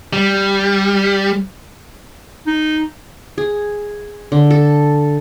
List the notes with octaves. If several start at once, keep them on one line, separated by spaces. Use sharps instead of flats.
G3
D#4
G#4
D3
A4